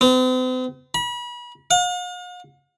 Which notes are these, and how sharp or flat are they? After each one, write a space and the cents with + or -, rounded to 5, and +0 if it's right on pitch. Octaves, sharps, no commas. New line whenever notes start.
C4 -45
B5 -35
F5 +45